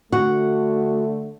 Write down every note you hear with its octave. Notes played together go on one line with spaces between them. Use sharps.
D3 A3 F#4